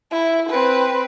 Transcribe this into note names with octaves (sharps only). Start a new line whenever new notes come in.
E4
C4 B4